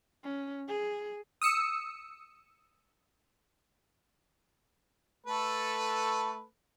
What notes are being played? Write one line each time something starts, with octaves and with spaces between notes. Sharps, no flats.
C#4
G#4
D#6 E6 C#7
A3 A4 B4